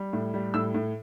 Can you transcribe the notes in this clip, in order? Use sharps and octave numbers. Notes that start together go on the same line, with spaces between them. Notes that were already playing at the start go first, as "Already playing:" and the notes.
Already playing: G3
A2
G3
A2 E6
A2